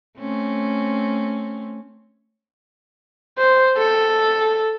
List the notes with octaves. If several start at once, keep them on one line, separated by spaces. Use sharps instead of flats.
A3 C4 C#4
C5
A4